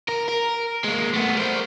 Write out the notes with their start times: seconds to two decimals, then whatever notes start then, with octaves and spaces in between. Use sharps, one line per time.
0.08 A#4
0.28 A#4
0.84 G#3 A#3
1.13 A3 B3
1.37 A#4 C5